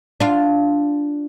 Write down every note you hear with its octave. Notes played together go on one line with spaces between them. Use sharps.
D4 F4